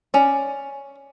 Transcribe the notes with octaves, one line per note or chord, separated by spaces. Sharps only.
C#4 D5